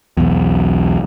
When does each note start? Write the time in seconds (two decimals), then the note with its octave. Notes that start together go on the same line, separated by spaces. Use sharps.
0.17 B1 E2